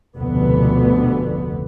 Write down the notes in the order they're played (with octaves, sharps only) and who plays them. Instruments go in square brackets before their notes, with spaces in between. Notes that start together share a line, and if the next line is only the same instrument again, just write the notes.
[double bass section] F1 D2 B2 D3 B3